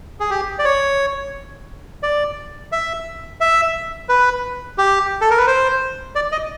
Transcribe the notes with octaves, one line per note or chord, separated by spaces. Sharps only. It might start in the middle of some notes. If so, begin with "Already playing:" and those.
G#4
G4
D5
C#5
D5
E5
E5
B4
G4
A4
A#4
B4
C5
D5
D#5